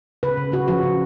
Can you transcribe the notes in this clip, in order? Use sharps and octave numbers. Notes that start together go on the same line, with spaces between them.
C#3 B4
C#3
C#3 F#4
F3 F#4
C#3